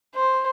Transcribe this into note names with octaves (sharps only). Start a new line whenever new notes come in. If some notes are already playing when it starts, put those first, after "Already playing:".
C5